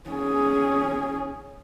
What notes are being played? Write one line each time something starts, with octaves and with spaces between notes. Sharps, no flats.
C#4 G#4